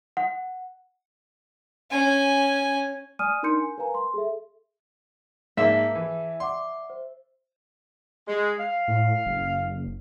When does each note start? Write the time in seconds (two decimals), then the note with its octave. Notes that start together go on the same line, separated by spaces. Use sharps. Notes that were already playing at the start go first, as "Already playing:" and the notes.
0.17 F#5
1.91 C#4 G#5
3.19 D5 G#5 D#6 F6 D#7
3.43 D4 D#4 A#4 C6 G6 C#7
3.58 G#5
3.78 A#4 B4 F5 G#5 A#5
3.94 C6
4.14 G#4 A4 E5
5.57 G#2 A#3 G#4 D5 E5 A5
5.95 E3
6.40 D5 F#5 C6 D6
6.90 C5
8.27 G#3
8.59 F5
8.88 A2
9.26 F#1